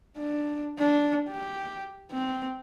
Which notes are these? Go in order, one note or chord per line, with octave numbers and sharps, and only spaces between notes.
D4
D4
G4
C4